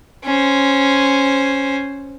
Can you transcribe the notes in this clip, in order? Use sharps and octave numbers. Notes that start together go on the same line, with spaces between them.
C#4 C5